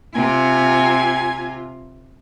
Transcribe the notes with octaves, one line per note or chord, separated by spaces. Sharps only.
C3 F4 G#5